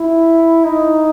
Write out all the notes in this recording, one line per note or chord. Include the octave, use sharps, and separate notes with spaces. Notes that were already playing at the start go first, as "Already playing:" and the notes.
Already playing: E4
D#4